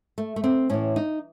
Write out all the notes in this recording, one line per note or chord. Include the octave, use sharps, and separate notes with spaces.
A3
A3
C4
A2 E3 C#4
D#4